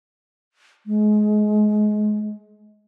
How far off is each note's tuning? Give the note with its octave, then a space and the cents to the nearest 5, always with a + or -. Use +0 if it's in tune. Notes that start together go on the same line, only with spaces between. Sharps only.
G#3 +25